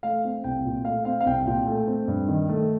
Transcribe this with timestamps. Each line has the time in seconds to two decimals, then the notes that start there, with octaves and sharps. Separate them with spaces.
0.03 A3 F5
0.25 C4
0.44 C2 G5
0.65 A#2
0.85 A3 F5
1.05 C4 F5
1.20 F5
1.26 C2 G5
1.47 A#2 G5
1.67 A3
1.87 C4
2.08 G2
2.28 D#3
2.49 A3